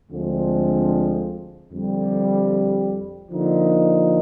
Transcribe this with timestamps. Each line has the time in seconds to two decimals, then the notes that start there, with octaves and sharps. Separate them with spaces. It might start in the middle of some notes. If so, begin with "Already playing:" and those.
0.11 D2 D3 F3 G#3 C4
1.71 F2 D3 G3
3.31 D3 F3 A#3 D#4